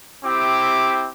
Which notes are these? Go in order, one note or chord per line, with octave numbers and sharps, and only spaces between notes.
C4 E4 G4 E5 D6